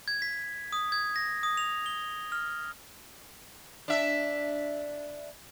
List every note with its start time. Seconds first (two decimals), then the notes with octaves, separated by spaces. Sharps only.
0.08 G#6
0.22 B6
0.72 D#6
0.92 G#6
1.16 A#6
1.43 D#6
1.57 F7
1.86 G7
2.32 F6
3.88 D4 E5